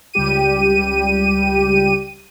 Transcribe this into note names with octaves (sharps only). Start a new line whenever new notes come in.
C#2 G3 G4 D#7